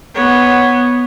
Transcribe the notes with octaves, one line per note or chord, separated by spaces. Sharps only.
B3 C#5